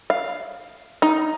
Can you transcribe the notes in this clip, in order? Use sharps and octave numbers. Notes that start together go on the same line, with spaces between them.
F5
D#4